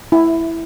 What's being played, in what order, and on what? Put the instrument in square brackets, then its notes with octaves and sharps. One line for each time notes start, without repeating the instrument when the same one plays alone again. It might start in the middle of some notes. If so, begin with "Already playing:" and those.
[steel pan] E4